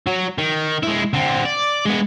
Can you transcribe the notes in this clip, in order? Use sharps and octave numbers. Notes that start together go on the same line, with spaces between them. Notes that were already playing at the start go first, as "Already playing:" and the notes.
F#3
D#3
G#3 E4
D3 C4
D5
G#3 B3